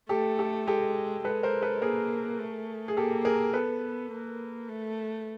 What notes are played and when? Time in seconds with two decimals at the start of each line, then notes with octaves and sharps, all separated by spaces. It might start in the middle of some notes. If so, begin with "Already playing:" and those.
0.09 A3 G4 A4
0.39 G4 A4
0.67 G#3 G4 A4
1.24 G#3 A4 B4
1.43 A#4 C5
1.62 A4 B4
1.82 A#3 G#4 A#4
2.39 A3
2.88 G#4
2.97 A#3 G4 A4
3.25 G#4 A#4
3.54 B3 A4 B4
4.12 A#3
4.68 A3